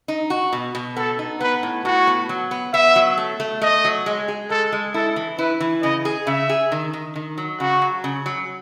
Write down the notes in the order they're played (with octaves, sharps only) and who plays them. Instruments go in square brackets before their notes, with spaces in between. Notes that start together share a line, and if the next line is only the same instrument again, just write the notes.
[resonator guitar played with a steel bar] D#4
F#4
B2
B2
[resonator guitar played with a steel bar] B3 [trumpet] A4
[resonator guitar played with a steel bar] D#4
[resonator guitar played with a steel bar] B3 [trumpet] B4
[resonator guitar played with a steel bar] A2
[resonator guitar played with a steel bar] A2 [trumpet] F#4
[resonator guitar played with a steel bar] B3
F#3
B3
[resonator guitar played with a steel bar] B3 [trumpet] E5
[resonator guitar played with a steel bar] F#3
A3
A3
[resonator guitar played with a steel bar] A3 [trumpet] D#5
[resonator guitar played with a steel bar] F#3
G#3
G#4
[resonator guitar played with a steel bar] G#3 [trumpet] A4
[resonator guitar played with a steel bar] G#3
[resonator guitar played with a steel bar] E4 [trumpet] A4
[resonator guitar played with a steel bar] E3
[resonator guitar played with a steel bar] E4 [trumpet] B4
[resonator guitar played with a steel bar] E3
[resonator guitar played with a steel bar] C#3 [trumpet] D#5
[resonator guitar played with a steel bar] G#4
[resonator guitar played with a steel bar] C#3 [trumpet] E5
[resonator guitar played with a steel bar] G#4
D#3
D#3
D#3
F#3
[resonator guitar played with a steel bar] C#3 [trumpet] F#4
[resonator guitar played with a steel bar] F#3
C#3
F#3